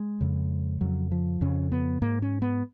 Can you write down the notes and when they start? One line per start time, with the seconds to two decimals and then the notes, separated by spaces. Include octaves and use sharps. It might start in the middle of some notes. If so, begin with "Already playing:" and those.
Already playing: G#3
0.21 F2 C#3
0.81 F2 C#3 F#3
1.11 F3
1.41 F2 C#3 C#4
1.72 B3
2.02 G#2 A#3
2.22 C#4
2.42 B3